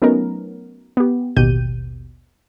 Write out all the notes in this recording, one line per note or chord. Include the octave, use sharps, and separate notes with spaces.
F#3 A3 B3 C#4 D#4 A#4
B3 G4
A1 D#2 B2 G4 G6 D#7